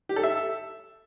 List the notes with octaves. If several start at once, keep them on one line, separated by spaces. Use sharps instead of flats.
G4
A4
E5